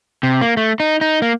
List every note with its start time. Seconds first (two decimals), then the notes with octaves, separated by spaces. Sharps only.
0.23 C3
0.41 A#3
0.57 A3
0.80 D#4
1.01 D#4
1.22 A#3